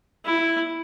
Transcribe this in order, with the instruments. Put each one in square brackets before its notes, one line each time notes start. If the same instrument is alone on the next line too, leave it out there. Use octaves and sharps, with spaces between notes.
[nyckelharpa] E4